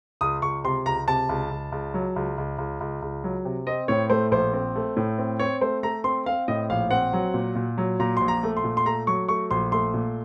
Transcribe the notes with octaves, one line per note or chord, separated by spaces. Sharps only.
C#2 D#6
C#2 C#6
C3 C6
C#2 A#5
C3 A5
C#2
C#2
C#2
F#3
C#2
C#2
C#2
C#2
C#2
F#3
C3
C4 D#5
A2 C#5
A3 C5
A#1 C5
C4
A3
A2
C4
C4 C#5
A3 C5
A3 A#5
C4 C6
C4 F5
A2 D#5
A#1 F5
C4 F#5
F#3
A#2
A#2
F#3
A#2 A#5
A#1 C6
A#5
A3
C6
A#2
C6
A3 A#5
F#3 C#6
A3 C#6
A#1 C6
A3 C6
A#2